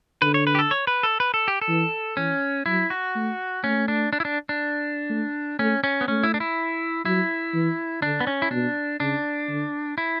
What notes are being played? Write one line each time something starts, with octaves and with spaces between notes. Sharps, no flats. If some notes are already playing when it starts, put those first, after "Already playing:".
D3 B4
C#5
B4
G4
A4
C#5
B4
A4
B4
A4
G4
A4
E3
E3 C#4
F#3 E4
F#4
A3
A3 C#4
D4
D4
E4
D4
D4
A3
A3 C#4
C#4
B3
A3 C#4
E4
D4
E4
F#3 E4
E3
D3 D4
B3
C#4
E4
B2 D4
C#3 D4
D3
E4